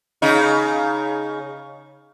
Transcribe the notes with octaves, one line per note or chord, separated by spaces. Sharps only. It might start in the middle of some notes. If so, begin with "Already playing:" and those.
C#3 D#4